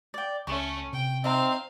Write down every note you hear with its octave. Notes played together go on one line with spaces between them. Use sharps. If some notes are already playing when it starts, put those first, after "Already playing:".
D5 G5
C#2 A3 C#4 C#6
C3 G5
C4 D#4 C5 E5 F5 A#5